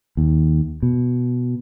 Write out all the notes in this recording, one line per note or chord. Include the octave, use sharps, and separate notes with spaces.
D#2
B2